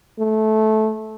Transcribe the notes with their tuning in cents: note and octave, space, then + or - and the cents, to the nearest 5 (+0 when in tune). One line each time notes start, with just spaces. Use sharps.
A3 -15